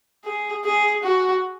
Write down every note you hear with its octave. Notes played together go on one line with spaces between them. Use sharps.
G#4
G#4
F#4